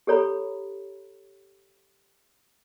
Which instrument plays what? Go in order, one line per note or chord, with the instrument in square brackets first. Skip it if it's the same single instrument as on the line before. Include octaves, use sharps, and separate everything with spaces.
[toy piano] G4 A4 C#5 A#5 B5